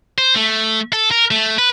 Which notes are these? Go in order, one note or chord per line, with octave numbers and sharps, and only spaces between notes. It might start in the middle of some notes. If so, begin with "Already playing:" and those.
C5
A3
A4
A#4
A3
B4